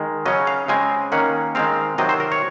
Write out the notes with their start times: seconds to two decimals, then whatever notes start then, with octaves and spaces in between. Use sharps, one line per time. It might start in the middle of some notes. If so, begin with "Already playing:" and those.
Already playing: D#3 G#3
0.26 C#3 F#3 C#4 D#5
0.47 F5
0.68 C#3 G#3 C4 G#5
1.12 D#3 A#3 C#4 F#5
1.55 D#3 G#3 C4 F5
1.98 C3 D#3 F#3 C4 D#5
2.09 C5
2.20 A#4
2.32 C#5